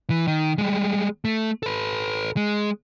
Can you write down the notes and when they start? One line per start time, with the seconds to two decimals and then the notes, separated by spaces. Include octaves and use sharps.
0.10 E3
0.28 D#3
0.58 G3 G#3
1.25 A3
1.63 A4 B4
2.37 G#3